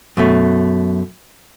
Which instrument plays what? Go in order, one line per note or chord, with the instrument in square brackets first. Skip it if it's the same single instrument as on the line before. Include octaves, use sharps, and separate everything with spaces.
[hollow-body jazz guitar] F#2 B2 A3